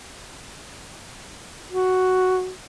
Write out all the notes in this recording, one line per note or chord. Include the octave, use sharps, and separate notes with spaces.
F#4